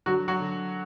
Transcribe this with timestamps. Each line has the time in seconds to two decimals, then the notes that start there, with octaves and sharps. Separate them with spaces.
0.06 D3 F#3 F#4
0.28 F#3 F#4
0.40 D3